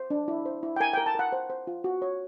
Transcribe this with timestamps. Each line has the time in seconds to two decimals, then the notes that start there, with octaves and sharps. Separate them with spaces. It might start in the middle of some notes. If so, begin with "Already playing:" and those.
Already playing: C5
0.10 D4
0.28 E4
0.46 C5
0.63 E4
0.76 G5
0.80 A#4 G#5
0.93 A#4 G5
1.06 A5
1.15 A#4 F#5
1.32 C5
1.50 C5
1.67 F4
1.84 F#4
2.02 C#5